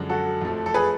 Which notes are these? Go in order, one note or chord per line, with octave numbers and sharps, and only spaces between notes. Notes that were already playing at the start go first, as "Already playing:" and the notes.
Already playing: F#2 D3 F3 G#3
F#4 A4
F2 F3 A3
A4
G#4 B4